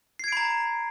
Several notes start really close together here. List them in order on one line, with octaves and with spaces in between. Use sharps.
C7 G#6 D7 B5 A#5